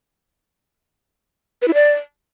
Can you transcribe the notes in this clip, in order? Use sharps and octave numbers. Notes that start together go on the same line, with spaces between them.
B4
E4
D5